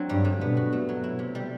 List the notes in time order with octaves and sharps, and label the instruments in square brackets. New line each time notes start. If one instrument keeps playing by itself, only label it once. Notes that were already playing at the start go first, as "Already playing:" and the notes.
Already playing: [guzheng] F#3 C4 D4
[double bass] G2 [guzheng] G3
[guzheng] D3
[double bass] B2 [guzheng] B3
[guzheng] F#4
A3
F#3
E4
C3
G3